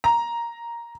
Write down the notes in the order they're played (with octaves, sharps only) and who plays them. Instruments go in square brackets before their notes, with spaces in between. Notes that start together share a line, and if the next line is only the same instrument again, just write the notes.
[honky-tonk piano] A#5